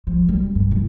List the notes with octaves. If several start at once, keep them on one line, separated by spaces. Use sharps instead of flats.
F3
G3
G2
D1